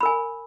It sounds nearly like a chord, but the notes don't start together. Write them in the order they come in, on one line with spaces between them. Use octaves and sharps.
B5 A#4 G#5